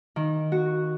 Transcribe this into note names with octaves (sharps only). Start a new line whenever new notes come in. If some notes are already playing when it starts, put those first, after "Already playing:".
D#3
F#4